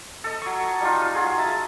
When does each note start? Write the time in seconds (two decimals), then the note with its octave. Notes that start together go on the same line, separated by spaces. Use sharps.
0.24 A4 D#5
0.42 F#3 C#6
0.80 G3 D#4 F4
1.01 A#4
1.15 F#3 F4 G#4
1.38 D#5 E5 A5